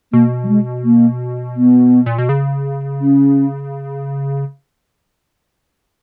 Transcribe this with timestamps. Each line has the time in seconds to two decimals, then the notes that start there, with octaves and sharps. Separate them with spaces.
0.12 B2 A#3
0.43 F#3
0.48 G#3
0.84 A#3
1.56 B3
2.06 A#2
2.18 B2
2.29 C#3
3.01 C#4